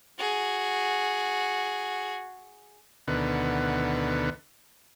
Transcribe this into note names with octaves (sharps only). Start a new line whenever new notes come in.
F#4 G#4
D2 B2 D3 D#3 B3 F#5